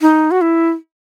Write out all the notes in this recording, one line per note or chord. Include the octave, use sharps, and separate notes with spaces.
D#4
F#4
E4